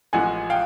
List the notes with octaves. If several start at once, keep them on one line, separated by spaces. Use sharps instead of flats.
A1 A2 F3 G#3 F#5 G#5
F5 G5